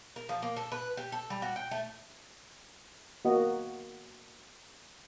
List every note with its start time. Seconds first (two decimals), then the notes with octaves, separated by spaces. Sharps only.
0.16 A#4
0.29 F3
0.42 A#3
0.57 A4
0.72 B4
0.97 G4
1.12 A4
1.30 G3
1.42 F#4
1.56 G5
1.71 A3
3.25 A#3 F#4 D#5